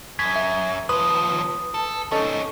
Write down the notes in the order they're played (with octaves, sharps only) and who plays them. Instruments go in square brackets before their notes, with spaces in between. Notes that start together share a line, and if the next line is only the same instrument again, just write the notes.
[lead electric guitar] F#2 [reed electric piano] G#6 [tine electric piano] B6
[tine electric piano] E5
[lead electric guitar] D#2 F3 [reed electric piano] B4 [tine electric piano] D#6
[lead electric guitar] A4
[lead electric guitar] C#4 D#4 [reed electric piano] A4 D#5 C#6